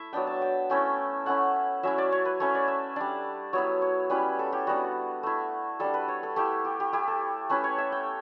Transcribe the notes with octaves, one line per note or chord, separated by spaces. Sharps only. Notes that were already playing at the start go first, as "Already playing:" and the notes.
Already playing: A3 E4 E5
F#3 B3 D4 G5
A5
G5
A3 C#4 E4 G5
A3 C#4 E4 F#5
F#3 C#4 E4 E5
D5
C#5
B4
A3 C#4 E4 C#5
D5
E5
G3 D4 D5
F#3 B3 E4 C#5
C#5
G3 C#4 E4 B4
A4
G4
G3 B3 D4 F#4
A3 E4
G3 D4 A4
B4
C#5
A4
A3 E4 G4
G4
G4
A3 E4 G4
A4
A3 C#4 E4 B4
C#5
E5
G5